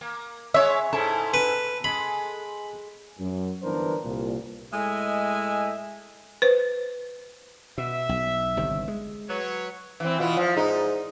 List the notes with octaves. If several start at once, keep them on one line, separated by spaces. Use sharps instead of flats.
A#3
G#3 C#5 E5
G#2 E4 A4
B4
G#3 B5
F#2
G1 E3 B3 D4 A#4 C5
C2 A#2
A2 G#3 D#5 E5 G#5
B4 C5
B2 E5
B1
G1 C3 D#3
G#3
F#3 B4 C#5
E3 C4
B2 E3 E4 F4
F3
G#2 D#4